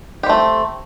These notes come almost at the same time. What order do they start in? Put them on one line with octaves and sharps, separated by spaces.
G4 C4 A3